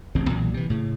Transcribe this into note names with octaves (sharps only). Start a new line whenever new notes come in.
D1 A1 C#3 C4
B1 A#2 E3
C3 E3
A2 C#3